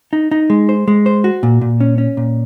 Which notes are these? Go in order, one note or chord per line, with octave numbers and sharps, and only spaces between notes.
D#4
D#4
G#3
C5
G#3
C5
F#4
A#2
A#2
C#4
C#4
A#2